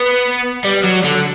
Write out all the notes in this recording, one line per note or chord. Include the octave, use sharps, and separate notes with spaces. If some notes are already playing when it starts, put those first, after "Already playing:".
Already playing: B3
G3
F#3
D3